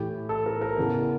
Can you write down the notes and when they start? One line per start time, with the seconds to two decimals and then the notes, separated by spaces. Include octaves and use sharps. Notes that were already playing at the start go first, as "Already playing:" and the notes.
Already playing: A2 E3 G4
0.29 A4
0.46 A#4
0.61 A#4
0.78 E2 C#3 E3